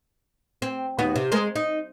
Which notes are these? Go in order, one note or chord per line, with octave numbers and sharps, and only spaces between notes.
C4
D#2 B3 F#4
C3
G#3 A#4 C5
D#4